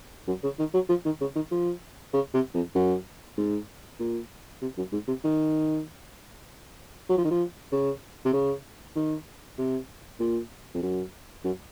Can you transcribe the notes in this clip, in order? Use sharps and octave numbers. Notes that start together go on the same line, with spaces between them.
F#2
C#3
D#3
F#3
F3
D#3
C#3
D#3
F3
C#3
C3
F2
F#2
G#2
A#2
C3
F#2
G#2
C3
D#3
F#3
F3
D#3
F3
C#3
C3
C#3
D#3
C3
A#2
F2
F#2
F#2